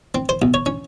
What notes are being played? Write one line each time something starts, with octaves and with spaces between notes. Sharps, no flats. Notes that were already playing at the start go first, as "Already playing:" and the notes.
C4
C5
B1
C#5
C#4